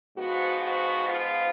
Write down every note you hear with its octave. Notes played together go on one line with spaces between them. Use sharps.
G#2 F3 B3 F#4
F#4
F4